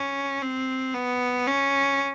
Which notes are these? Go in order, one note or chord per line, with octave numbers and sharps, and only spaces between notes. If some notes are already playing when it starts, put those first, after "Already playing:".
Already playing: C#4
C4
B3
C#4